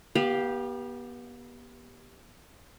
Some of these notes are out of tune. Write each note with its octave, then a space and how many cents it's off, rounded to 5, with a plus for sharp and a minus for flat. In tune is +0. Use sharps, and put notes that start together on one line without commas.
B3 -35 G4 +0 F5 +0